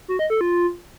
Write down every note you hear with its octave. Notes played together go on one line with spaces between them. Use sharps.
F#4
D#5
A4
F4